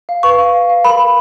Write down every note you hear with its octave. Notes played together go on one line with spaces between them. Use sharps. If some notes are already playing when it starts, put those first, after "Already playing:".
F5
B4 C#6
F5
F5
F5
A#4 B5
A#4